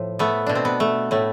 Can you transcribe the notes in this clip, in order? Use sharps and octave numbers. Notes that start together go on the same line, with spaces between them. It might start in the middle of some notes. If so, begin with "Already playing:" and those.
Already playing: A2 F3
A3 B3
B2 D4
C4
B3
A3
A2 A3